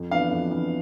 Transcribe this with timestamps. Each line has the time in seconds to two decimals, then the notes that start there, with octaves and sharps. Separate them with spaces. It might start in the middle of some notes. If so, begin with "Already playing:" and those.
Already playing: F2
0.11 E3 B3 D4 F5
0.31 F2
0.51 E3 B3 D4